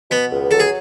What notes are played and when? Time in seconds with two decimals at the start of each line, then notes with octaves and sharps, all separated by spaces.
0.11 B2 B3
0.32 C#2
0.51 F#3 A4
0.60 G#4